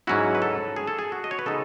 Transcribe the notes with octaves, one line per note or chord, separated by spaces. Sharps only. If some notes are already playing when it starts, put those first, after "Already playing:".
G#2 F#3 C#4 E4 F#4
B4
A4
G#4
A4
G#4
F#4
D#5
C#5
B4
C#3 G#3 B3 D#4 A4